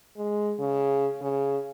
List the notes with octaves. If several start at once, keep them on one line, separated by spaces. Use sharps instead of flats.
G#3
C#3
C#3